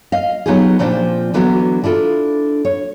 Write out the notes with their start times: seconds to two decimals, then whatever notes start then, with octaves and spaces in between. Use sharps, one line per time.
0.12 D#5 F5
0.46 F#3 B3 D#4 F4 G4 G#4
0.79 A#2 F3 C4 D4 F4
1.34 D3 E3 F#3 B3 D#4 F#4
1.84 D4 E4 F4 A4
2.65 C#5